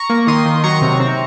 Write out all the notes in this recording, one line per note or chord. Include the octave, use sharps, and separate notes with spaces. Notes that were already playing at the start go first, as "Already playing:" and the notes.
Already playing: A#5 C#6
A#3
D#3 C6 D#6
D#3
F#3 A#5 C#6
C3
C4